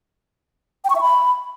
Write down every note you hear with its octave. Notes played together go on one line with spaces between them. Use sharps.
G5
C#6
E5
B5